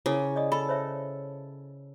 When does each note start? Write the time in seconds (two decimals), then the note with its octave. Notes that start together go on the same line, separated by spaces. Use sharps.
0.06 C#3 E4 G#4 A#4
0.36 D5 D#5 D#6
0.52 A4 B5
0.69 C5 C#5 E5